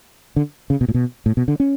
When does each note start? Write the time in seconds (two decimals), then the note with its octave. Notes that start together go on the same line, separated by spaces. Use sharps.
0.36 D3
0.70 C#3
0.81 B2
0.88 A2
0.94 B2
1.26 A2
1.37 B2
1.48 D3
1.60 C#4